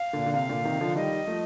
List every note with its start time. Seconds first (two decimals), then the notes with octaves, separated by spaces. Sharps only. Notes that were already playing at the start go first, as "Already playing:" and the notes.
Already playing: F5
0.13 A#2 D3
0.26 D3
0.34 C3 F5
0.49 A#2 D3
0.65 C3 D#3
0.81 D3 F3
0.96 D#3 G3 D#5
1.27 F3 A3